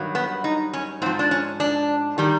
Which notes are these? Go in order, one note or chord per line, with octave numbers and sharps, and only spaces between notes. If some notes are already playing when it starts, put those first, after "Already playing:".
Already playing: G2 D#3 F#3
B3
D#4
C#4
G#2 F3 C4
D4
C#4
D4
D#3 G3